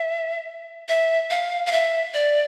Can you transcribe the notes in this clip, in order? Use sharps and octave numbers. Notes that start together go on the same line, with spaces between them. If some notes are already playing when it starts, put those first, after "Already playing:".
Already playing: E5
E5
F5
F5
E5
D5